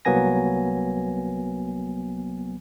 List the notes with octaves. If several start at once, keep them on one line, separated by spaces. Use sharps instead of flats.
C2 F#3 A#3 B3 G#5 A#6